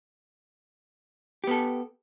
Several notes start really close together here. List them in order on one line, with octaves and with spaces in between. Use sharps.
G4 B3 A4